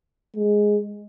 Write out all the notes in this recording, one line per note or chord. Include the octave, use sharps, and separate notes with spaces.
G#3